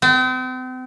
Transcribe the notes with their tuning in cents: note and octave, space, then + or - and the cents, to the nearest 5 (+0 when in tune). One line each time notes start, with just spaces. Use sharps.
C4 -40